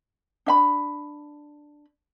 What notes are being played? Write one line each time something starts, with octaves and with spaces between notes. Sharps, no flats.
D4 E5 B5